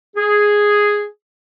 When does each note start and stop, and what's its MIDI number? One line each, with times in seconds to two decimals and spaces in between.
0.16 1.04 68